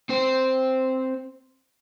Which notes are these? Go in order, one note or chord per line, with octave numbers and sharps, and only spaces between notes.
C4 C5